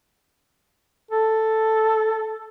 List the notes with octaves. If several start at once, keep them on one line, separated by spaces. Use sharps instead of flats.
A4